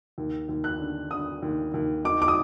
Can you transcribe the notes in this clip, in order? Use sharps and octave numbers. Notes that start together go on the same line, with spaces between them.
D#2
D#2
F#6
D3
D3 D#6
D#2
D#2
D#3 D6
D6
D#6